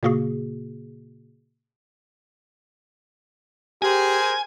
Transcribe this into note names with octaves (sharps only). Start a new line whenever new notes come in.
A#2 C#3 A#3 F#4 G#4
G4 G#4 A#4 C5 G#5